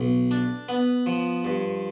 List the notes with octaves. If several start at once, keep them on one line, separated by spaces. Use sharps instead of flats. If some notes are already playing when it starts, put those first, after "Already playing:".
Already playing: B1
D4
B3
F3
G2